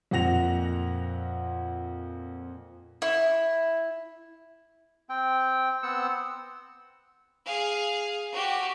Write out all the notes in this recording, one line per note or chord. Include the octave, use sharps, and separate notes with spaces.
F2 A#2 F#5 A#6 F7
E4
C4 G5
B3 C4 F#5 E6
G#4 F5
F#4 G4